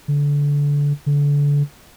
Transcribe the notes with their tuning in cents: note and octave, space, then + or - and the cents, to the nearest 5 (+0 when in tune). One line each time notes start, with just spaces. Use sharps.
D3 -25
D3 -30